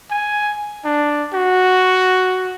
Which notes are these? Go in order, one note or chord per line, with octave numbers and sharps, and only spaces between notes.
G#5
D4
F#4